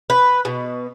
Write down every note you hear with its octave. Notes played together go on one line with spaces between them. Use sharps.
B4
B2